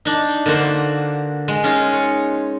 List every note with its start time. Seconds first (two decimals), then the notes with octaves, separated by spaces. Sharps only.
0.05 D4 D#4
0.46 D3 A#3 F#4 C5
1.48 G#3
1.64 C#4 D#4 F4 G#4
1.93 C#5